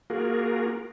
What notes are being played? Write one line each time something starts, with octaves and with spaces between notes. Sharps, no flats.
A#3 F4 F#4 G#4 A#4